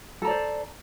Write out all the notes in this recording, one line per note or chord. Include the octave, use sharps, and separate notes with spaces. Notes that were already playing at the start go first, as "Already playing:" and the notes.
A4 C5 D5 A#5